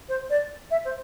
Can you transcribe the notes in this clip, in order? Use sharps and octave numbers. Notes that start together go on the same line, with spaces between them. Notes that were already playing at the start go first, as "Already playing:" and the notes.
C5
D5
E5
C5